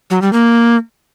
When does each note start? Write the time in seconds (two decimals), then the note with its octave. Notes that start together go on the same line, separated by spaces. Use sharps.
0.10 F#3
0.22 G3
0.33 A#3